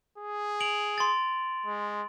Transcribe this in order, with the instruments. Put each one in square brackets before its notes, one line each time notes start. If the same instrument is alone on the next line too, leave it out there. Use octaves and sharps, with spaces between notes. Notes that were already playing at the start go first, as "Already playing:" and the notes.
[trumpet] G#4
[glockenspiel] D7 F7 F#7
C6 A6
[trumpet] G#3